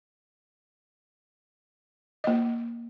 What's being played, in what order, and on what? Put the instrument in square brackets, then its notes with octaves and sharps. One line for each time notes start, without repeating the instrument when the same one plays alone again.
[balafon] A#3 D#5